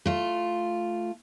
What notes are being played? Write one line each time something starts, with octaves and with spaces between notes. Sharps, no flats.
A3 F4